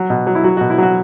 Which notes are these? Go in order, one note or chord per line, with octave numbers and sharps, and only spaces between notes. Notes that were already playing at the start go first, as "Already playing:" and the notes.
Already playing: F#3
B2
F#3
E4
F#3 F#4
B2 F#4
E4
F#3 F#4